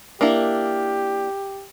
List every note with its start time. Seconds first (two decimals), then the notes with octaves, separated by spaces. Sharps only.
0.21 A#3 D4 E4 G4